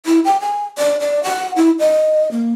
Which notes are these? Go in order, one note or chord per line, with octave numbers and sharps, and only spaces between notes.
E4
G5
G#5
D5
D5
F#5
E4
D#5
A#3